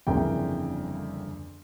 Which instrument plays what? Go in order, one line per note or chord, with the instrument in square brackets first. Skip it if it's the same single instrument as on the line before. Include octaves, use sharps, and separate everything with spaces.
[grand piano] G1 F2 C#3 E3 A#3 G5